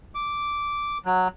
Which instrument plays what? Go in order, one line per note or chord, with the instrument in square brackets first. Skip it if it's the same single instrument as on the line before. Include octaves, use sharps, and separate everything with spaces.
[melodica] D6
F#3